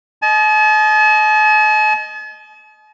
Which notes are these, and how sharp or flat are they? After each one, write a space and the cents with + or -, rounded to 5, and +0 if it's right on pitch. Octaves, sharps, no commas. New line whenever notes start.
D#5 +0 A5 -45